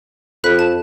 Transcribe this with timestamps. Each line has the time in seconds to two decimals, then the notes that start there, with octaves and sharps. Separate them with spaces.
0.44 F2 B5 F#6 B6
0.59 A5 E7